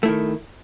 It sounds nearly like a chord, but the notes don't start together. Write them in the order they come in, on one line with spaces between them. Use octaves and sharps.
A3 E4 D#3